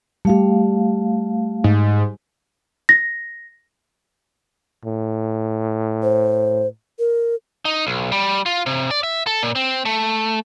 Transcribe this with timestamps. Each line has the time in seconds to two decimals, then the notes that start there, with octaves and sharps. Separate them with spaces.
0.25 G3 A3 G4 F5
1.64 G#2
2.89 A#6
4.85 A2
6.03 C5
6.99 A#4
7.65 D#4
7.87 B1
8.12 G3
8.46 F4
8.66 C3
8.91 D5
9.03 E5
9.27 A4
9.43 A#2
9.55 C4
9.85 A3